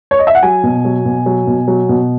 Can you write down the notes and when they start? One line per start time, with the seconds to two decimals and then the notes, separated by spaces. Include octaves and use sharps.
0.11 C#5
0.19 D#5
0.27 E5
0.35 F#5
0.43 F#3 G#5
0.63 B2
0.85 F#3
1.05 B2
1.26 F#3
1.47 B2
1.68 F#3
1.89 B2